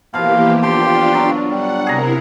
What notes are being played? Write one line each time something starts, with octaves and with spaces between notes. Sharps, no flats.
B2 E3 F3 A#3 G4 F5
D3 D4 F4 G4 G5 C6
F#3
G3 F#5
C3 E4 G#4 A#4 A#5